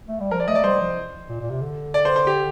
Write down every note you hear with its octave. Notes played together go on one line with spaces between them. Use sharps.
A3
G3
F3 A#4
D5
A3 D#5
D5
G3 C5
F3
A#2
A#2
C3
D3
D5
C5
C5
G4